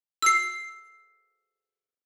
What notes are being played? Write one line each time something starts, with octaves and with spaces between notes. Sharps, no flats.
E6 C7